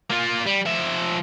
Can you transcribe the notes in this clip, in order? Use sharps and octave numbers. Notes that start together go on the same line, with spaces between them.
A#3 F4
G3
F3 E5